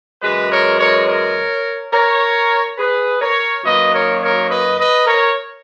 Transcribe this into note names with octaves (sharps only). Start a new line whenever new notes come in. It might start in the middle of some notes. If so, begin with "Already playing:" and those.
F#2 E3 G#3 G#4 B4
A#4 C#5
A#4 C#5
A#4 C#5
A#4 C#5
G#4 B4
A#4 C#5
F#2 D#3 F#3 A#3 B4 D#5
A#4 C#5
A#4 C#5
B4 D#5
B4 D#5
A#4 C#5